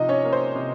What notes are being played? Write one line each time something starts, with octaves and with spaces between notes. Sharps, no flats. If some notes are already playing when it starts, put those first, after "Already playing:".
Already playing: C3 F3 D#4 D#5
C#4 C#5
A#3
C5
C3